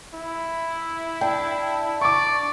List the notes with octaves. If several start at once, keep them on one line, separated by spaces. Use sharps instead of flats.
E4
D4 G5
D5 C#6 D6